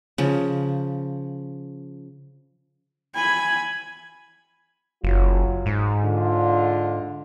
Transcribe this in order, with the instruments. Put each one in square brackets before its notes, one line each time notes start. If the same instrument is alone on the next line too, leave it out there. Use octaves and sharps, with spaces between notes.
[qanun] C#3 F3
[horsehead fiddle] G#5 B5
[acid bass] F#1 [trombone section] F#3 F4
[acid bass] G#2
[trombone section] D3 F4